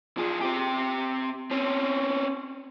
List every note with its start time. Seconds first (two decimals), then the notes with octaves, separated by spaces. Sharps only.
0.17 F3 G#4
0.41 C4 G4
1.51 C4 C#4